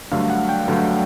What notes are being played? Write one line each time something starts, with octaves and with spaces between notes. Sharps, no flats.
G2 D3 F#3 A3 F5
F#5
G5
G2 D3 F#3 A3